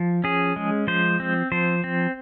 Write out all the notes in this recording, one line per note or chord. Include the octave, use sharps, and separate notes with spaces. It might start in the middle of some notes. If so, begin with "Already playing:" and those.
Already playing: F3
C#4 G#4
G#3
F3 C5
C4
F3 C5
C4